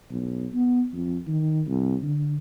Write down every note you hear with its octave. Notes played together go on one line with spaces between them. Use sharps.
B1
B3
F2
D#3
C2
D3